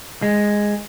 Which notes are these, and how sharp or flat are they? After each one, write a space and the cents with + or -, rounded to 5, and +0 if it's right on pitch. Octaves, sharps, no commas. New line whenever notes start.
G#3 -5